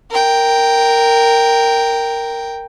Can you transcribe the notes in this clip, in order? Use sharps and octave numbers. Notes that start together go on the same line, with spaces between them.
A#4 G5